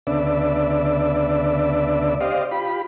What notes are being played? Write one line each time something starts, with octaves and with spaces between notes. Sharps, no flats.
D2 C#3 B3 D4 D5 E5
G4 C5 D5 D#5 F5
F4 G4 B5